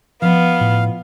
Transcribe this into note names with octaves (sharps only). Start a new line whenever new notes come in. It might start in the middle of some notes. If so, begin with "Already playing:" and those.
F3 B3 D#5 F5
A2